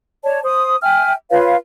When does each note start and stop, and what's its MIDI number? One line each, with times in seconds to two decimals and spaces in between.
0.23 0.40 73
0.23 0.40 74
0.23 0.40 81
0.45 0.76 72
0.45 0.76 87
0.82 1.12 76
0.82 1.12 79
0.82 1.12 80
0.82 1.12 89
1.30 1.55 65
1.30 1.55 71
1.30 1.55 73
1.30 1.55 77